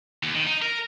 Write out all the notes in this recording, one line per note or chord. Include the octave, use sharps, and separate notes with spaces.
D#2
D#3
D#4
A#4